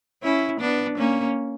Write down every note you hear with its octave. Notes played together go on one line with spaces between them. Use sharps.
C#4 E4
B3 D4
A#3 C#4